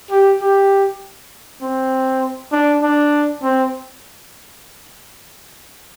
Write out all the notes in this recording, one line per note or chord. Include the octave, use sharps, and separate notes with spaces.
G4
G4
C4
D4
D4
C4